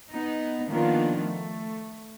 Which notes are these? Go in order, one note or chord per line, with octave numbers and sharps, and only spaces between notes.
B3 D#4
D#3 F3 A#3 B3 D4 F4
A3